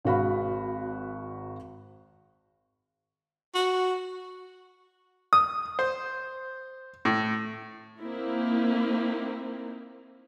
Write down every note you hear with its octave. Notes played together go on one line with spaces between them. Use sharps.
G#1 G#3 F#4 F5 B5
F#4
D#6
C5
A2
A#3 C4 D#4 E4